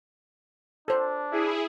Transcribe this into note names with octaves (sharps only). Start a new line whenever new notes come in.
D4 A4 C5
E4 G#4